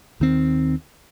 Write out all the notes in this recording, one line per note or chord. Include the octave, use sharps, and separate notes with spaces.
D#2 D#3 C4